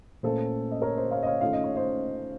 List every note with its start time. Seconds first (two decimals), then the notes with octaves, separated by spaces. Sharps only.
0.23 A#2 A3 C#4 A4 C5
0.71 D#5
0.82 A#4 C#5
0.97 C5 D#5
1.11 C#5 F5
1.23 D#5
1.26 C#5 F5
1.41 D#3 A3 C#4 F4 F5
1.53 D#5
1.64 C#5
1.76 C5 D#5